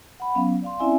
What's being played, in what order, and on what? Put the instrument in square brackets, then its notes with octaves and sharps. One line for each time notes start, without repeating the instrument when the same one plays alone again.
[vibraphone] F#5 B5
F#3 B3 C#4 F5
D5 F5 C6
C4 C#4 E4 D5 E5 G#5